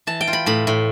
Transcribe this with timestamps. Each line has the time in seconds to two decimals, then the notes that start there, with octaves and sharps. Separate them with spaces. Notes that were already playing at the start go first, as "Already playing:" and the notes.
0.07 E3 A5
0.21 G5
0.27 F4
0.33 B5
0.46 A2 B5
0.67 A2